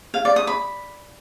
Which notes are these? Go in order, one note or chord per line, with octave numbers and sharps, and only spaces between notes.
F5
D5
D#6
B5